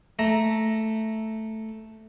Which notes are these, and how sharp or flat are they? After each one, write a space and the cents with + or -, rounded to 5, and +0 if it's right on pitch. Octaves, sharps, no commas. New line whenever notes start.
A3 +0 A#5 +0